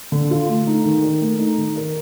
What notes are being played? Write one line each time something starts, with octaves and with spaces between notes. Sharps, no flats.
D3
F4
A3
D#4
D#3
A#4
A3
D#4
D#3
A#4